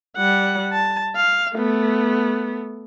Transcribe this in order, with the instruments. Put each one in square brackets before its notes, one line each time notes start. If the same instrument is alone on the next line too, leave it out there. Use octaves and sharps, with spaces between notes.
[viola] G3 F#5
A5
F5
A3 B3